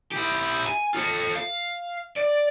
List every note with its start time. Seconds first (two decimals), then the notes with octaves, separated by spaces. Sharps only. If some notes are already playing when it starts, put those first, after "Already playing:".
0.12 E4 G4
0.67 G#5
0.95 F4 A4
1.35 F5
2.16 D5